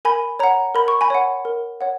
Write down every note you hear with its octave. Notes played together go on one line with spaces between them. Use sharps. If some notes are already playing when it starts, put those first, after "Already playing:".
A#4 G#5 B5
C#5 F#5 A#5
A#4 B5
C#6
G#5 B5
C#5 F#5
A#4
C#5 F#5